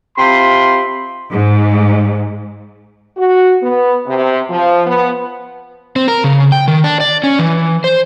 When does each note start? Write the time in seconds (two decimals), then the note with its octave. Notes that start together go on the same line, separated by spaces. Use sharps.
0.17 C3 F4 B5 C6
1.31 G#2
3.17 F#4
3.62 B3
4.07 C3
4.49 F3
4.87 B3
5.96 C4
6.08 A#4
6.24 C#3
6.52 G5
6.68 D#3
6.84 D4
7.00 D5
7.24 C#4
7.39 E3
7.84 C5